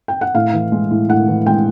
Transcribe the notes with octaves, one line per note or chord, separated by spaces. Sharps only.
G5
F#5
A2 F5
E3
G#3
A2
A2 F#5
E3
G#3 G5